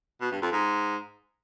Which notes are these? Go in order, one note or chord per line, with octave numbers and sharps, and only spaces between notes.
B2
G2
F2
G#2